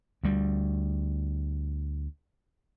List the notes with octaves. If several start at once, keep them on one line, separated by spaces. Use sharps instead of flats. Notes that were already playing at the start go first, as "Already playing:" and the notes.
D2 G3